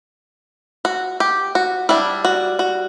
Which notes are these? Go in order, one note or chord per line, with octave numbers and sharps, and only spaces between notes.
F#4
G4
F#4
G3 D4 E4
F#4
F#4